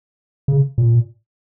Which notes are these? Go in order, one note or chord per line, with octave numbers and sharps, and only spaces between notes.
C#3
A#2